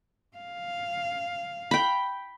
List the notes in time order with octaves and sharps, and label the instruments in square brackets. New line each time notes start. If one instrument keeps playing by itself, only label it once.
[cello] F5
[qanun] G5 B5